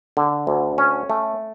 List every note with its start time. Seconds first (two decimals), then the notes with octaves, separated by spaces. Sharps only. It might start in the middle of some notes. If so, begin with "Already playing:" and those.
0.17 D3
0.47 D2
0.78 C#4
1.10 A3